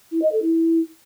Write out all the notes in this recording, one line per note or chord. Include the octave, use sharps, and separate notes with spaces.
E4
D#5
A4
E4